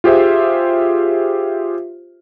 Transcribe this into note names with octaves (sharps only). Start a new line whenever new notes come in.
F4 G4 G#4 C5 E5